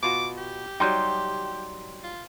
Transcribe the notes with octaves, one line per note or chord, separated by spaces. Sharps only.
B2 F4 F#4 D6
G4
F#3 G3 D#4 G5 C6 G6
F4